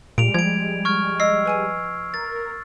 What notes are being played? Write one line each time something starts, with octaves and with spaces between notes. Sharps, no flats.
A#2 G3 G#3 D7 F7
F3 G#6 D7
C#6 F6 G#6
D#5 E6 C7
B4 G#5 D#7
A#4 A6